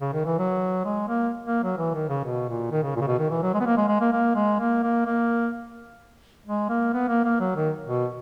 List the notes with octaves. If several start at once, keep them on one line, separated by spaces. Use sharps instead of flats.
C#3
D#3
E3
F#3
G#3
A#3
A#3
F#3
E3
D#3
C#3
B2
A#2
D#3
C#3
A#2
C#3
B2
D#3
E3
F#3
G#3
B3
A#3
G#3
G#3
A#3
A#3
G#3
A#3
A#3
A#3
G#3
A#3
B3
A#3
A#3
F#3
D#3
B2